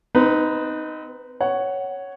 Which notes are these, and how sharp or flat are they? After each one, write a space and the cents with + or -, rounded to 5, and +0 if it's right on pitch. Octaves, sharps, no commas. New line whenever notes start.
C4 -30 D#4 +0 B4 +0
C#5 +0 F#5 +10